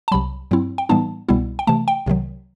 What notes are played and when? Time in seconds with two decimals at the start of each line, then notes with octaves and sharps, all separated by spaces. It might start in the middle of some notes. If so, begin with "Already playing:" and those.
0.08 A5
0.12 C2 C3 F#3 B5
0.51 G2 F#3 C4 E4
0.78 G5
0.89 A2 E3 G3 B3 D#4 A5
1.29 C2 B2 G3 B3 E4
1.59 G5
1.67 C3 E3 A3 A5
1.88 G5
2.06 C2 C3 D#3 F#3